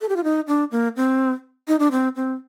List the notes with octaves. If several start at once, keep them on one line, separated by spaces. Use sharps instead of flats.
A4
G4
F4
D#4
D4
A#3
C4
D#4
D4
C4
C4